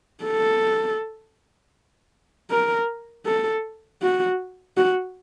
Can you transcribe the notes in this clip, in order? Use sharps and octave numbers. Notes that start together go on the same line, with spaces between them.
A4
A#4
A4
F#4
F#4